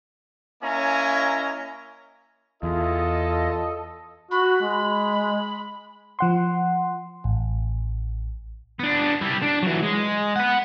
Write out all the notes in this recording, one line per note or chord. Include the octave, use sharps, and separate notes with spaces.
A#3 C#4 E4 D#5 G#5 A#5
E2 F4 A4 D#5
F#4 B5
G#3
F3 F#5 C6
A1
B3 D4
G3 E4
D4
E3 F#3
G#3
B4 F#5